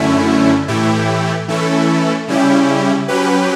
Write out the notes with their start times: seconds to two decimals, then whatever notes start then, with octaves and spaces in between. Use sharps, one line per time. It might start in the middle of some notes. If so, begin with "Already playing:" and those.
Already playing: F#2 D3 A3 C#4 E4
0.68 A2 E3 A3 E4 G4
1.48 E3 A3 C#4 E4 A4
2.28 C#3 G3 C#4 E4 G4
3.08 F#3 C#4 G4 B4